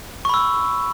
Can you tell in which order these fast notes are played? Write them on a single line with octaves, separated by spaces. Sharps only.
C#6 B5 E6